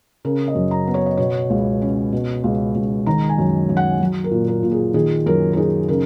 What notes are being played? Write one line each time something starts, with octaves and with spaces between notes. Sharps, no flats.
C#3 A#4
D#5
F#2
A#5
B3
C#5
D#5
B2 C#5
C#2
C#4
B2
C#2
C#2
D#3 A#5
G#5
F#2
F#2
F#5
F#3
A#4
A#2
A#4
A#2
G#4
D#3 G#4
F#2 A#4
A#4
D#4 G#4
C#3 A#4